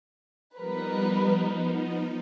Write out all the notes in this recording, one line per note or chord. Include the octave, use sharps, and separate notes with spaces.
F3 G3 B3 D#4 A#4 B4